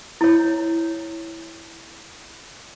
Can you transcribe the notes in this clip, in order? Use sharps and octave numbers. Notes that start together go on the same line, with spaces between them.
E4 C#5